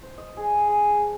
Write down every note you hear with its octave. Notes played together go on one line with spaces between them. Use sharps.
C5
D#5
G#4
G#3
A5